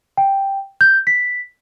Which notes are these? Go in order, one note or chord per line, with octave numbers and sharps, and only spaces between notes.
G5
G6
B6